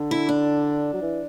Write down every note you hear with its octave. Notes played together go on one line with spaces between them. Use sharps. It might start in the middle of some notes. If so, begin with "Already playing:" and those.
Already playing: D3
E4
D4
F#3
E3